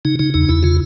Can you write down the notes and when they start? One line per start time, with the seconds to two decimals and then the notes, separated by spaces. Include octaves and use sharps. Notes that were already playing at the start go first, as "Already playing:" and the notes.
0.05 C#3 D#4
0.19 C#3 D#4
0.34 E2 D#4
0.49 E2 E4
0.63 C#3 F4